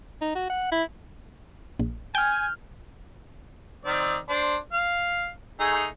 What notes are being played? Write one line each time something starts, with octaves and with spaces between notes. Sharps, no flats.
D#4
F#4
F#5
E4
A#1
G5 G#5 F6 G6
D#3 C4 D5
D4 C5
F5
A3 D#4 G#4